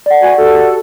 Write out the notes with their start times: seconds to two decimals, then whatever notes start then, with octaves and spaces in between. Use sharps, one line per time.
0.06 D5 F#5
0.22 F#4 G#5
0.37 F#4 G4 A4